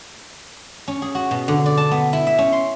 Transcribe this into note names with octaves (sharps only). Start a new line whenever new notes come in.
C#4
G#4
F#4
B2
D3
D5
A5
B3
E4
E5
C#4
C6